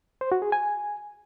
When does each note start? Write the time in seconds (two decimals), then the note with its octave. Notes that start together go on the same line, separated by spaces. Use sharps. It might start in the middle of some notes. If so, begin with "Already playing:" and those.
0.21 C5
0.32 F#4
0.42 G#4
0.52 G#5